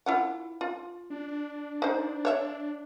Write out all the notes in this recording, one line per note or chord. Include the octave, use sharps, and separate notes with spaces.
E4 F4 F#5
F4
D4
D#4 C5
C#5 E5